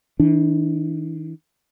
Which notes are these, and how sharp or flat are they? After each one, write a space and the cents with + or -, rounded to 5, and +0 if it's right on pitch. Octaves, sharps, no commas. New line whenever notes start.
E3 -45 D4 +0